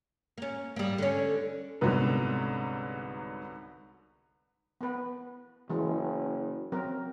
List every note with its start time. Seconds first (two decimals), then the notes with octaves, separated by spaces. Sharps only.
0.38 A#3 C#4
0.76 G3 A#3
0.98 D3 C#4
1.81 C2 G#2 D3 F#3 B3
4.81 B3 B4
5.70 F#1 E3 G#3
6.72 F#3 C4 A#4